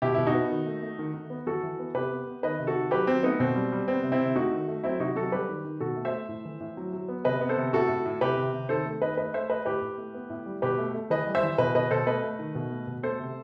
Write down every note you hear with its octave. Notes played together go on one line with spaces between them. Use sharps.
B2 E4 G4
B2 E4
D#4 F#4
B3
D#3
A3
A3
D#3
D#3
B3
E3 F#4 A4
E3
B3
C3 G4 B4
B3
B3
D#3 B4 D#5
C3
F#4 A4
D#3
F#3 G4 B4
F#3 C4
A3 B3 D#4
B2 C4
G3
G3
B3 C4
C3
C4 E4
C3
A3 D#4 F#4
D#3
A3
F#3 C4 E4
C3 D#4 F#4
F#3 F#4 A4
G3 G4 B4
D#3
D#3
B2 F#4 A4
A3
C5 E5
A3
A2
E3
A2
F#3
F#3
B3
C3 B4 D#5
B3
A4 C5
C3
A2 F#4 A4
A2
A2
C3 G4 B4
C3
C3
D#3 A4 C5
A3
D#3 B4 D#5
A3 B4 D#5
A3 C5 E5
A3 B4 D#5
A2 G4 B4
A2
A3
B3
A2
G3
B2 G4 B4
A3
A3
E3 B4 D#5
G3
C5 E5
E3
B2 B4 D#5
B2 B4 D#5
B2 A4 C5
A3 B4 D#5
A3
D#3
B2
A3
B2
A3 A4 C5
C3